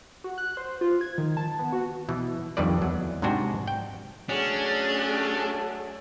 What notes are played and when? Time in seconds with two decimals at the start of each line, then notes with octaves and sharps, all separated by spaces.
0.24 F#4
0.38 F#6
0.57 C5
0.81 F4
1.01 G#6
1.18 D#3
1.37 A5
1.59 B3
1.73 F#4
2.09 B2 E3
2.57 F2 D3 D#3 G3 B4 D5
2.82 E2 F#3
3.22 G#2 C3 G#3 D4 F#4 G5
3.68 G5
4.29 F#3 A3 C#4 D4 G#4